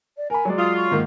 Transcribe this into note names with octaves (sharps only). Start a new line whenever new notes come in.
D5
A#4 G#5 B5
F#3 G#3 D5
F4 D#6
C#6
G#2 D#3 A#3